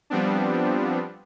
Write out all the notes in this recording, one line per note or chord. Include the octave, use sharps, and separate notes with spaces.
F3 G3 B3 C4 D4